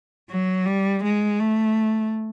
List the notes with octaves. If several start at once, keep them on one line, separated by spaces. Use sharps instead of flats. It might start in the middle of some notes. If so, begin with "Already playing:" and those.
F#3
G3
G#3
A3